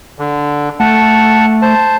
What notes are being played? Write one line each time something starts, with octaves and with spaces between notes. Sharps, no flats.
D3
A3 F#5 A5
C5 A5